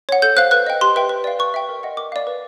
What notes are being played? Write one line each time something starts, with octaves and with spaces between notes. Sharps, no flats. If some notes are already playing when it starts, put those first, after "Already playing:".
C#5 F#5
A4 G6
C5 F5 F#6
B4 F#6
D#5 G5
G4 C6
B4 E5 G5
B4
D5 F5
B4 C#6
E5 G5
A#4
D#5 F#5
A#4 D6
D5 F5
B4